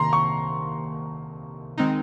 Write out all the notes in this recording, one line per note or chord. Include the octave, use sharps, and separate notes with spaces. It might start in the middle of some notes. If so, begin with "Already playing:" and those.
Already playing: C3 D#3 A#3 A#5 C6
C#6
D#3 G#3 C4 D#4